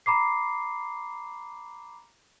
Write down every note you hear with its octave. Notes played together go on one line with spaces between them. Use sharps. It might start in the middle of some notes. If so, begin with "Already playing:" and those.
A#5 B5 D6 C7